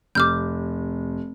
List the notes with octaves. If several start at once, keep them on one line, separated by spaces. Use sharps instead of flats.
F1 D6 F6 G6